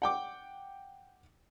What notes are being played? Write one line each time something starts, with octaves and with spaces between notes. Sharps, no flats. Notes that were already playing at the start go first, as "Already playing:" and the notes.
F#5 G5 D6